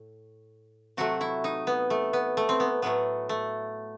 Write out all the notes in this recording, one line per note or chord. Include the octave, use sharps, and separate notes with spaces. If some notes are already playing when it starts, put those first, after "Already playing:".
Already playing: A2
C3 F#3 A3 F#4
E4
D#4
B3
A3
B3
A3
C4
B3
A2 F#3 A3 B3
A3